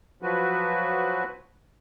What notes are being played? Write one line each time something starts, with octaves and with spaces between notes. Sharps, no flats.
F3 F#3 F#4 B4